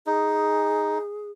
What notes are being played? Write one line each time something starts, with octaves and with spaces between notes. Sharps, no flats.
D#4 G#4